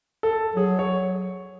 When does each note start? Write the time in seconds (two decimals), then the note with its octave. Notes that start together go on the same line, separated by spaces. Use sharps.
0.23 A4
0.56 F#3 G#4
0.79 C#5